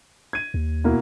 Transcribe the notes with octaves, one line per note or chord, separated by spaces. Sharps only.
G#6 D#7
D#2
B2 A#3 E4